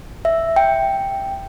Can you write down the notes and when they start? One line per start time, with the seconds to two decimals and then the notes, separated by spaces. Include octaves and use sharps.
0.25 E5
0.56 G5